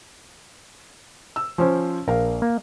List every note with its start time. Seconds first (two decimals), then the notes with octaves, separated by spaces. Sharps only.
1.36 E6
1.58 F3 C#4 C5
2.08 A#1 A#4 F5
2.42 A#3